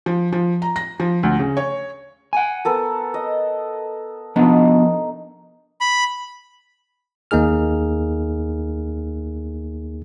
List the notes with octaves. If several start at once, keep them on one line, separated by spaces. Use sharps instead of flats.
F3
F3
A#5
A#6
F3
D2
C#3
C#5
F#5 G#5
B3 A4 A#4
D#5
F3 B3 D4 D#4
B5
D#2 A#3 D#4 G#4 F6